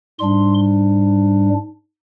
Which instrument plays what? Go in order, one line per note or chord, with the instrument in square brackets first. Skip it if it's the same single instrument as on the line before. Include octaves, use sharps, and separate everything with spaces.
[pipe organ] G#2 G3 D4 C6